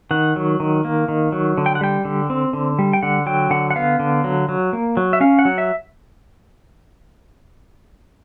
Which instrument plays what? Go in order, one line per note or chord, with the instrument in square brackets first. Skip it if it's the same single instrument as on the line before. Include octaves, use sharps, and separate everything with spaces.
[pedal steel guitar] D#3 F#5
F#3
D#3
A#3
D#3
F#3
D3
G5
F#5
G3 G5
D3
C4
D3
G3
G5
D3 F#5
F#3 G5
D3 F#5
F#5
B3 F5
D3
F#3
F#3
A#3
F#3
E5
C#4 F5
F#5
F#3
E5